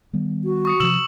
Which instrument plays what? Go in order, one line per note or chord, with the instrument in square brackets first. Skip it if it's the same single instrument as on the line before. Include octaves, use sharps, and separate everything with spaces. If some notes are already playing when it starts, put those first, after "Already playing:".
[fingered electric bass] D#3 G3 B3
[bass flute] F#4
[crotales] C#6 D#6 C#7
[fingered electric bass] C3 F3 [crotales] E6 E7 F#7